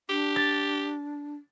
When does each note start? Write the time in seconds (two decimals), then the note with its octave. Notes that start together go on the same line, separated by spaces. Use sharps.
0.10 D4 G4
0.36 A6